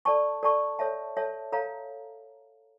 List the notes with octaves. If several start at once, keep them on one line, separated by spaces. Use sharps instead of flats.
A4 D5 A5 C#6
A4 D5 A5 C#6
A4 C#5 E5 A5
A4 C#5 E5 A5
A4 C#5 F5 A#5